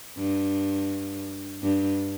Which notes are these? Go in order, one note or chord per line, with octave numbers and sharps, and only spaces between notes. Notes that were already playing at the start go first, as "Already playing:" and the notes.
G2
G2